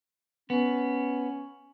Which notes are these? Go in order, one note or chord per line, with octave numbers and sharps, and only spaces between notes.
B3 C#4